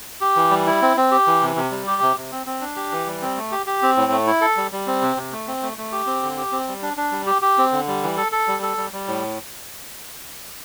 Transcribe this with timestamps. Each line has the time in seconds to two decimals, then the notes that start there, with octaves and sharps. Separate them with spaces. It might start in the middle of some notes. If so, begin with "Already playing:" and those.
0.21 G4
0.36 E3
0.51 G3
0.67 E4
0.82 C4
0.97 C4
1.12 G4
1.27 E3
1.41 C3
1.56 C3
1.71 G3
1.87 G4
2.02 C3
2.17 C3
2.32 C4
2.46 C4
2.61 D4
2.76 G4
2.92 E3
3.07 G3
3.22 C4
3.37 A3
3.52 G4
3.66 G4
3.82 C4
3.97 A2
4.12 A3
4.27 E4
4.41 A4
4.57 G3
4.72 G3
4.87 C4
5.02 C3
5.16 C3
5.32 A3
5.48 C4
5.62 A3
5.78 A3
5.92 G4
6.06 C4
6.23 D3
6.37 G4
6.52 C4
6.68 G3
6.82 D4
6.97 D4
7.12 G3
7.27 G4
7.42 G4
7.58 C4
7.72 D3
7.88 G3
8.03 E3
8.17 A4
8.32 A4
8.47 G3
8.62 A4
8.77 G3
8.93 G3
9.07 A2